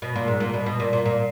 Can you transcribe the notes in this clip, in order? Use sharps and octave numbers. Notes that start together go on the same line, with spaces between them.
B2
A#2
G#2
A#2
B2
B2
A#2
A#2
A#2